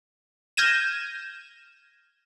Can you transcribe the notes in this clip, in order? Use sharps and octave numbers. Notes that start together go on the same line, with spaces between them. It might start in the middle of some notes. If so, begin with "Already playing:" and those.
F6 G6 G#6 A#6 D#7 E7